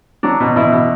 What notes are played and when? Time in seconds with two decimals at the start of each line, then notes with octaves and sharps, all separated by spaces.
0.23 F#3 D4
0.40 B2
0.56 B2 E4
0.72 B2